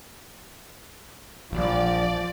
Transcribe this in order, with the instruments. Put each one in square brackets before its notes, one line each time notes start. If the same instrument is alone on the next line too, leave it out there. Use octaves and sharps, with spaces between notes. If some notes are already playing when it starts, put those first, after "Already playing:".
[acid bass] A#1 [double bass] F3 [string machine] D5